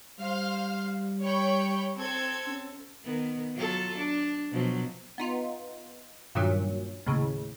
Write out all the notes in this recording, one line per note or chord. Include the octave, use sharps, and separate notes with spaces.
G3 C5 F5
C#5 G5 B5
C4 A4 G#6
C#4
D#3 B3
F#3 F4 A4
D4
B2 F3 F#3
B3 D#4 F4
G2 A#2 D#3 F#3
D#2 A2 C#3